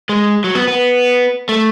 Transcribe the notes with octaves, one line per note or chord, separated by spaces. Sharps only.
G#3
F#3
B3
B3
A3